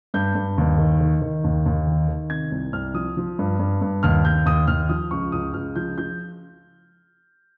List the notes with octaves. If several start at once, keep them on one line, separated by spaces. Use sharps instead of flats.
G2 G6
G2
D#2
D#3
D#3
D#3
D#2
D#2
D#3
D#3
C3 G#6
C2
C2 F6
F3 D#6
F3
G2
G2
G2
D#2 F6
D#2 G6
D#2 D#6
D#2 F6
F3 D#6
C#2 C#6
C#2 D#6
C#2 F6
F3 G6
F3 G6